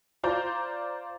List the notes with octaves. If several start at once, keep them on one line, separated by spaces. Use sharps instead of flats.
F4 C5 D5 A#5 G6